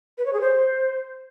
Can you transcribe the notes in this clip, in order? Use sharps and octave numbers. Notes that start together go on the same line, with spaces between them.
B4
C#5
G#4
C5